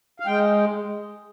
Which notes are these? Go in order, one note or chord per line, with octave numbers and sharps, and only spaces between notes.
F5
G#3 G5